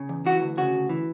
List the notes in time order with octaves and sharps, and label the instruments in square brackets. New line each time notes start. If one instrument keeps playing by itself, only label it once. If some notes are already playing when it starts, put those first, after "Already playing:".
Already playing: [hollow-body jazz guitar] C#3
E2
E3 F#4
D2
C#3 F#4
D2
E3